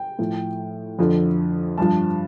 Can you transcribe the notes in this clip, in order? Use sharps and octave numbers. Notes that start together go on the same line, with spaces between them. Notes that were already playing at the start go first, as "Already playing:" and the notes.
Already playing: G5
A2 F3
F2 D3 F3
G2 F3 A5